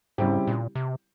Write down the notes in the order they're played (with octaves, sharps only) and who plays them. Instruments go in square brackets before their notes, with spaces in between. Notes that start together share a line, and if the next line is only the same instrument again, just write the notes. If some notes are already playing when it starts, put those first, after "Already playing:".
[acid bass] G#2 [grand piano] C#3 G3 C4 E4 G4
[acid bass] A#2
C3